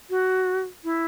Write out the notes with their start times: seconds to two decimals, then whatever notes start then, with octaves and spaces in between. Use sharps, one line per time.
0.10 F#4
0.84 E4